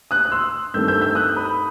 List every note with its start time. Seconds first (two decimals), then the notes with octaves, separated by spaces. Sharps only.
0.11 D#6 F#6
0.25 F#6
0.32 C6 E6
0.74 G2 D#3 A3 C4 E6 G6
0.88 E6 G6
1.01 E6 G6
1.15 D#6 F#6
1.36 B5 D#6